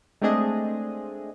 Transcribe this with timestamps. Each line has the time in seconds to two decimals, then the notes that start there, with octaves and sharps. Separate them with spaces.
0.21 G#3 A3 C4 D4 G#4 D#5